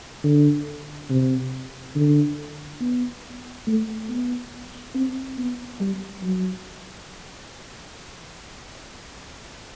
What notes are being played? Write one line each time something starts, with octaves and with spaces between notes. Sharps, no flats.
D3
C3
D3
B3
A3
B3
C4
B3
G3
F#3